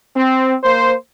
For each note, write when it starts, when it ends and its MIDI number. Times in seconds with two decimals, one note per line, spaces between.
0.15 0.53 60
0.64 0.93 58
0.64 0.93 72